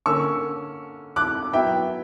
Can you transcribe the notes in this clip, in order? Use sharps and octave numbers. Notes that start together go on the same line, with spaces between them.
D3 A#3 C#4 C#6 E6
D6 F#6
F#3 B3 E4 E5 G5